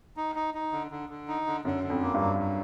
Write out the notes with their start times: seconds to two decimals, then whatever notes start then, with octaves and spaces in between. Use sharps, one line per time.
0.17 D#4
0.35 D#4
0.54 D#4
0.73 D3
0.91 D3
1.09 D3
1.28 D#4
1.47 D3
1.65 F#2 D3
1.83 D3
1.90 F2
2.03 A#3
2.14 G2
2.20 F#3
2.39 F#3